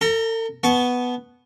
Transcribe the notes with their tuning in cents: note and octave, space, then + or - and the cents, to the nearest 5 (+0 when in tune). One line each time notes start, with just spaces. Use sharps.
A4 +45 A#5 +0
B3 +0 A5 -35 C#6 +0